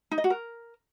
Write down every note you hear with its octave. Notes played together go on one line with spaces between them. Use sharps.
D#4
D#5
F#4
A#4